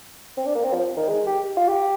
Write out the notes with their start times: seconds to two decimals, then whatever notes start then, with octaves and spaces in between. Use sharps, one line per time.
0.37 C4
0.46 D4
0.55 A#3
0.64 C4
0.74 F3
0.97 D#3
1.09 G#3
1.27 G4
1.57 F4
1.68 G4